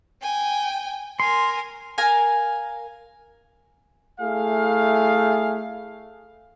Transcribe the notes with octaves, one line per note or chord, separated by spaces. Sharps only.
G5 G#5
A#4 G#5 C6
A#4 F5 G#5
A3 E4 G#4 F5